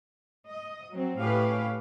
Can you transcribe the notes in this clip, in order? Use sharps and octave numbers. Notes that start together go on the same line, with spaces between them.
D#5
F#3 C4
A2 C#4 G4 B4 F5